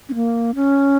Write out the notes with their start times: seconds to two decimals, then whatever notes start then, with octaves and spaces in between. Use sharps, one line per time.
0.09 C#4
0.15 A#3
0.55 C#4